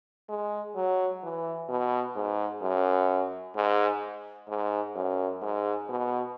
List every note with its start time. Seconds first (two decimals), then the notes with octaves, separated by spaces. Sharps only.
0.29 G#3
0.76 F#3
1.23 E3
1.69 B2
2.16 G#2
2.62 F#2
3.56 G#2
4.48 G#2
4.95 F#2
5.42 G#2
5.89 B2